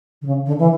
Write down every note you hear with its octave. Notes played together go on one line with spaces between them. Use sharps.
D3
C#3
D3
E3